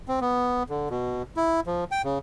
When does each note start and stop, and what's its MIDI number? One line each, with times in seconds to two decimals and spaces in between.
0.08 0.20 60
0.21 0.63 59
0.69 0.89 50
0.90 1.23 47
1.37 1.60 64
1.67 1.84 53
1.91 2.02 79
2.04 2.19 49